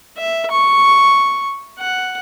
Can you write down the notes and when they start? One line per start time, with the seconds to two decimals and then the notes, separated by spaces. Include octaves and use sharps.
0.18 E5
0.51 C#6
1.79 F#5